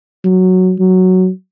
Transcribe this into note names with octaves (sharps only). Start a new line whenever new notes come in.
F#3
F#3